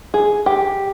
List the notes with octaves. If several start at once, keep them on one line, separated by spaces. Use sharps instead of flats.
G#4
G4